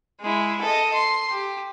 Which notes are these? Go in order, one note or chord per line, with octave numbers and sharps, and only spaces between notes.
G#3 E4
A4 D#5
C6
G4